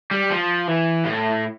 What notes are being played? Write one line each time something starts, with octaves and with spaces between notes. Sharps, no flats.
G3
F3
E3
A2